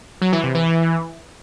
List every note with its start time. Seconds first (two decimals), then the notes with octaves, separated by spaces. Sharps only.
0.22 F#3
0.33 E3
0.44 C3
0.55 E3